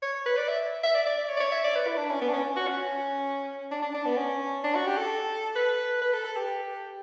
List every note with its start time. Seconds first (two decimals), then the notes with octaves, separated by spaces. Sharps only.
0.02 C#5
0.26 B4
0.37 D5
0.48 E5
0.83 E5
0.94 D5
1.06 D5
1.17 D5
1.29 C#5
1.37 D5
1.40 C#5
1.52 E5
1.64 D5
1.76 B4
1.87 E4
1.98 D4
2.10 C#4
2.22 B3
2.29 D4
2.33 C#4
2.56 F#4
2.67 C#4
3.71 D4
3.82 D4
3.94 D4
4.06 B3
4.17 C#4
4.64 D4
4.75 F#4
4.87 G4
4.98 A4
5.56 B4
6.02 B4
6.13 A4
6.24 A4
6.36 G4